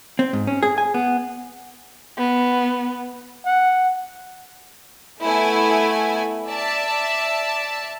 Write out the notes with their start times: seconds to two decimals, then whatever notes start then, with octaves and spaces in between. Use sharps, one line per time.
0.19 C4
0.33 G#2
0.47 C#4
0.63 G#4
0.78 G#5
0.94 B3
2.18 B3
3.46 F#5
5.21 A3 B3 E4 G#5
6.47 D5 E5 A5